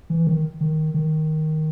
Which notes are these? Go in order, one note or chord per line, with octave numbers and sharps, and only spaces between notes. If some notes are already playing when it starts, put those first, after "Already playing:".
E3
D#3
D#3
D#3